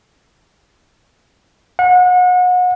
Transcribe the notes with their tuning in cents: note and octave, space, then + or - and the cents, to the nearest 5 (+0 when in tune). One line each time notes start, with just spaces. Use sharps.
F#5 -35